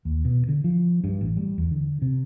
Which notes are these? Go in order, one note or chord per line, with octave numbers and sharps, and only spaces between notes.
D#2
B2
D3
F3
G2
A1
G3
E2
D3
C3